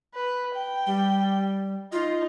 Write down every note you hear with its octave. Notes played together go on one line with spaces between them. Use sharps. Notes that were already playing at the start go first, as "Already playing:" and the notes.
B4
G5
G3
D#4 F4